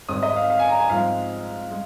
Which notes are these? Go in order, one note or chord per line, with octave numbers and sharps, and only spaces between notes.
G#1 G#2 G#3 C4 D#6
D#5
F5
F5
G#5
A#5
G#5
G#2 F3 G#3 C4 F5
G#3